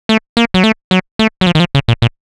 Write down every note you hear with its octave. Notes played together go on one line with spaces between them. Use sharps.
A3
A#3
F#3
A3
F#3
A3
F#3
F3
D#3
F3
C#3
A#2
A#2